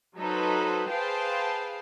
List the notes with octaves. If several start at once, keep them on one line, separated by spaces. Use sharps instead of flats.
F#3 D#4 A4 B4 C5
G#4 B4 C5 F5 G5 A5